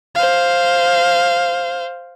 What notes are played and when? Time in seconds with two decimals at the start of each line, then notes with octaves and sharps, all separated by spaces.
0.15 C5 F5